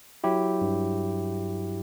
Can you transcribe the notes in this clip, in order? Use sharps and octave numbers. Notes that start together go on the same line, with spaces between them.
F#3 E4 G4
G2